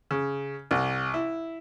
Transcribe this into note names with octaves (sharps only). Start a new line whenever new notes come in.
C#3
C2
E4